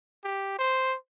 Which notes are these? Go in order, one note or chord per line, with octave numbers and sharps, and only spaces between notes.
G4
C5